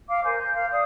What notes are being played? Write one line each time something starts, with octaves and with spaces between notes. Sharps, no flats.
F5 D6
A#4 C5 G#5
G6
F5
D5 F5 D#6